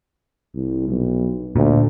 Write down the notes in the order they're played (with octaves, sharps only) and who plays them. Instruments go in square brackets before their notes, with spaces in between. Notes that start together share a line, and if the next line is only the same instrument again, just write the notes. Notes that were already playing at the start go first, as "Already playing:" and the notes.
[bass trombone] C2
B1
[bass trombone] D2 [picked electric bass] A#2